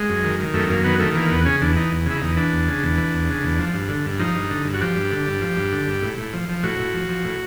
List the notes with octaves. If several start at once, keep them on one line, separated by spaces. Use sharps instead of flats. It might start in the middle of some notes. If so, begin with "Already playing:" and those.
Already playing: G#3
F#2
D#3
D#3
F#2 A3
F#2 A#3
D#3 B3
D#3 A3
E3 A#3
E2 B3
C#3 C#4
E2 D4
E3 D#4
E2
C#3 E4
E2 D#4
E3 D4
E2
C#3
E2
E3
E2
C#3
E2
F3
G2
D3
G2
F3 D#4
G2
D3
G2
F#4
F3 G4
G2
D3
G2
F3
G2
D3
G2
A2
A2
F3
F3
A2 F#4
A2
F3
F3
A2